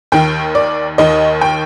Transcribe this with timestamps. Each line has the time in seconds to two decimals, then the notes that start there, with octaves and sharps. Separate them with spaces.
0.12 D#2 D#3 G5
0.55 D5
0.98 D#2 D#3 D#5
1.41 G5